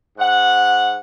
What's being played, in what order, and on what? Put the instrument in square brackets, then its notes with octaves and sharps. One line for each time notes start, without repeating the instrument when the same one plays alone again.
[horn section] G#2 F#5